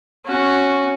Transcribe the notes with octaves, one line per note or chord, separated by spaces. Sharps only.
C#4 F#4